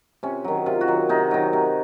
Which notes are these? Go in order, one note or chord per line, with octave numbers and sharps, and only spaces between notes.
C3 C#4
D#3 F#3
C3 F4
F#4
D#3 F#3
C3 D#4
D#3 F#3
C3